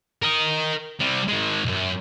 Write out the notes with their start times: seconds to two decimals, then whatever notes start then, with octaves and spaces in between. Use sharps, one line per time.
0.22 A#4 D#5
1.00 C3 G3
1.28 D#3 G#3
1.65 B1 F#2